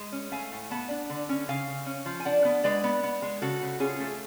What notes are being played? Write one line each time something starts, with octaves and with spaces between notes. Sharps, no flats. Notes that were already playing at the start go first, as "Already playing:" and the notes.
Already playing: G#3
C#4
A3 F5 G#5
A2
B3 F#5 A5
D4
D3
C#4
C#3 F5 G#5
C#3
C#4
F3
G#5
D4 D5 F#5
B3
G#3 B4 D5
B3
B3
G#3
C#3 F#4 A4
C#3
C#4 F4 G#4
A3